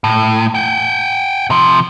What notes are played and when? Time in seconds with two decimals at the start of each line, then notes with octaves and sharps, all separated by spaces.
0.04 A2
0.55 F#5 G5
1.50 C3 F3